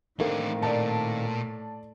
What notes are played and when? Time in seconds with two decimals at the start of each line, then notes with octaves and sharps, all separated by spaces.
0.20 A2 D#3 E3 A#3 C4 D4 A4
0.62 A#2 D5 A5